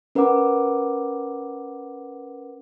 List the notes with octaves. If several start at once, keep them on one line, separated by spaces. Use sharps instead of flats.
C#4 A#4 B4 F#5 D6